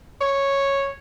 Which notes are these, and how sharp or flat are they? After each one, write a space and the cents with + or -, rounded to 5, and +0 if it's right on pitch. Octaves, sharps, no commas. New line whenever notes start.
C#5 -5